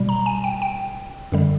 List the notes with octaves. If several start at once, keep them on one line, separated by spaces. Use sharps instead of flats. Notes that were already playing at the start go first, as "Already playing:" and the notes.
Already playing: B2 G3
A#5
G#5
G5
G5
F#2 D3 G3